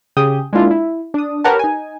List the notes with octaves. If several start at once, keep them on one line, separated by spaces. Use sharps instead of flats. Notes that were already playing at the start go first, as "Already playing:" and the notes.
C#3 G4 G#4 D#6 G6
G#3 A#3 D4 E4 F4
E4
D4 D#6
G4 A#4 B4 C#5 F#5 A5
D#4 G#5